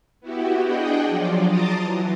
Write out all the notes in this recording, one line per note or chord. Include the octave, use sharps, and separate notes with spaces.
B3 E4 F#4 G4
D4 G#4 D#5 F#5 G5
F3 F#3 F4 D5
A5 A#5 C6 D6 D#6 A6
E3 F#3